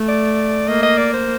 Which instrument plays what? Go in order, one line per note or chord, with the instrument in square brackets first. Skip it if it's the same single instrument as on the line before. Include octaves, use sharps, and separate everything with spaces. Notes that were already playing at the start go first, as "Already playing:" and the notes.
Already playing: [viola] A3
[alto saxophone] D5
[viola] A#3 [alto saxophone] D#5
[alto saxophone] D#5
D5
C5